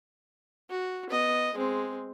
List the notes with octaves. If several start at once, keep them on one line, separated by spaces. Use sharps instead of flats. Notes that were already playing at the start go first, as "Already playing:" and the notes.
F#4
B3 D#5
G#3 C4